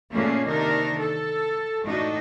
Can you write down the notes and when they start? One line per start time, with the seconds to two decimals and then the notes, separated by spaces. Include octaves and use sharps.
0.12 A#2 A3 A#3 C#4 D4 G#4
0.47 C3 D#3 D4 D#4 A#4
0.99 A4
1.86 A2 D4 D#4 F#4